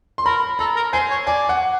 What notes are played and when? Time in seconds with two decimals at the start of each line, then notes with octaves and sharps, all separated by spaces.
0.18 C6
0.26 A#4 B5
0.59 A4 A#5
0.76 A#4
0.93 C5 G#5
1.10 C#5
1.27 D5 G#5
1.49 F#5